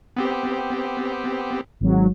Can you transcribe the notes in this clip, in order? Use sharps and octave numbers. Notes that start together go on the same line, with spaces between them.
B3 C4 G4
G#1 F#3